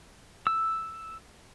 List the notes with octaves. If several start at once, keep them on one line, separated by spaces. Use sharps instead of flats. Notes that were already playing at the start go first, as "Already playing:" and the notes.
E6